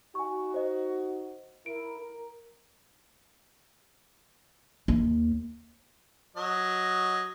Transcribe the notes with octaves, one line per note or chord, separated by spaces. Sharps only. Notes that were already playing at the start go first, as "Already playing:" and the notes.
D#4 F#4 G#5 C#6
C5 D#5
E4 A#4 D7
A#4
D#2
F#3 D#5